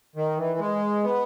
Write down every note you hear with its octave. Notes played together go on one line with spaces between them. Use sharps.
D#3
E3
G#3
B3